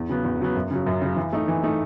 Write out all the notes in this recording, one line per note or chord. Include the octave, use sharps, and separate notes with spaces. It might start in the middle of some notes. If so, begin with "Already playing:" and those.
Already playing: E2
C#3 F#3 B3
E2
C#3 F#3 B3
F#2
C#3 F#3
F#2
C#3 F#3
E3
A3 D#4
E3
A3 D#4